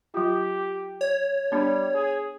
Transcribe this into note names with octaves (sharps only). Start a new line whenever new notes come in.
F#3 F4 G4
C#5
G3 B3 D4
G#4